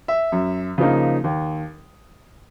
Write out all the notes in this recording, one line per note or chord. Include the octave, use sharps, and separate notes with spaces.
E5
F#2
C#3 F3 A#3 D#4
D#2